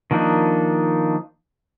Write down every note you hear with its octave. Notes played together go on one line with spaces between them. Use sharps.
D#3 F3 A#3 D4 D#4